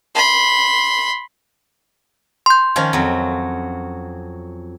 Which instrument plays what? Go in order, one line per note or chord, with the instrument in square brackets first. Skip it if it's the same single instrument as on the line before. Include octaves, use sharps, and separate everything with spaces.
[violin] B5 C6
[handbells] C6 G6
[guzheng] D#3 F3 C#4
F2 F#3